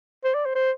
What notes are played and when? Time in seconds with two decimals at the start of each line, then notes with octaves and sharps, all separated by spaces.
0.24 C5
0.34 D5
0.45 C5
0.55 C5